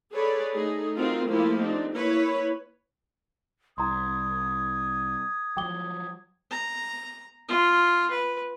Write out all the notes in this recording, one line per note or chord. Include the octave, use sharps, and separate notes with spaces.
G#4 A4 B4 C#5 D5
A3 D#4 G#4
C4 D#4 F4 F#4 A#4
F3 A3 A#3 E4 F4 G4
C4 D4 D#4
A#3 E4 B4 C#5
C2 A#5 C6 D#6 G#6
F3 F#3 G5 D6 G7
A#5
F4
B4